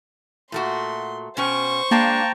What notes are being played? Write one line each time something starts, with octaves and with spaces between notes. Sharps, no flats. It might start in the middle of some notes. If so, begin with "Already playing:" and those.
A#2 A3 F#4 C6
B2 C#4 C5 G5 C#6
G#3 A#3 D4 G5 A5 A#5